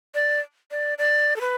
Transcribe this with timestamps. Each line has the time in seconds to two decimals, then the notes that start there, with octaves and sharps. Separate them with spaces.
0.15 D5
0.71 D5
0.98 D5
1.36 A4
1.41 B4